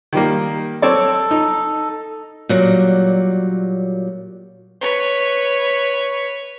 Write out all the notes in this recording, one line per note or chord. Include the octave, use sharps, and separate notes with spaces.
D#3 G3 A#3
C4 A4 C#5 D5
D#4
A#2 F#3 G3
B4 C#5